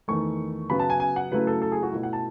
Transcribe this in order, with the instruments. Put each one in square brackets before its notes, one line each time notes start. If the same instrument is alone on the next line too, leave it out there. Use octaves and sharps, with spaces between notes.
[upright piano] E2 D#3 A3 C#6
C#3 F#3 B3 B5
A5
G#5
G#5
F#5
C#3 F#3 A3 E4 B4
A4
A4
G#4
F#4
B2 A3 E4
F#5
A5